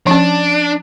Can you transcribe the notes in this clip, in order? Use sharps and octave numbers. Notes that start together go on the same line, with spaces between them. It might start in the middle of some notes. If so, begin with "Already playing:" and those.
F3 C#4 D4